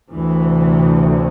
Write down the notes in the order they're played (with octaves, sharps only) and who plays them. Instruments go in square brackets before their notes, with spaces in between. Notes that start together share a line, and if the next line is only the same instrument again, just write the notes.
[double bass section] D2 C3 E3